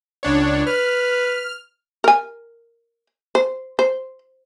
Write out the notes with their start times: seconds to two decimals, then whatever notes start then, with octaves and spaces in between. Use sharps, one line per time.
0.23 C#2 D4 C#5
0.67 B4 F6
2.04 A#4 G#5
3.35 C5
3.79 C5